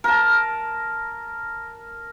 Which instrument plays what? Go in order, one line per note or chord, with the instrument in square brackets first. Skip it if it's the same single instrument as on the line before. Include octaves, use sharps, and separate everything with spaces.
[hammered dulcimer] A#4 A5